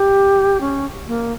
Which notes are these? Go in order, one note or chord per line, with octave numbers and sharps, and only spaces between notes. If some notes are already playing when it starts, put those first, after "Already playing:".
Already playing: G4
C#4
A#3